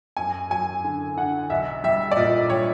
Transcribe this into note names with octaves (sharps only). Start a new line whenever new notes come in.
F#2 G#5
F#3 G#5
D3
D3 F#5
B1 E5
G3 E5
D5
A#2 D#5
G3 C#5